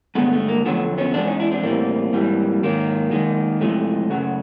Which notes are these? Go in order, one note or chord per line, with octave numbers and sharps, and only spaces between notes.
G2 D3 F3 G#3 A3 B3
A3
A#3
F2 D3 F#3 A3 B3
B3 C#4
E2 C3 E3 G#3 C4 D4
C#4 D#4
D4 E4
C4 D4
A2 E3 G3 A#3 C4
G#2 E3 G3
G#2 D#3 F#3 A#3
F#2 D#3 G#3
F2 C3 E3 G#3 A3
F#2 C#3 F#3